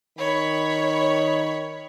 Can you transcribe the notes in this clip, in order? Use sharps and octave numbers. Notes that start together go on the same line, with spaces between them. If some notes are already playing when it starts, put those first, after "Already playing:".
D#3 C#5 B5